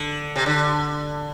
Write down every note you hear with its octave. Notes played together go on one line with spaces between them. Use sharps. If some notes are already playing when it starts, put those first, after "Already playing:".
Already playing: D3
C3
D3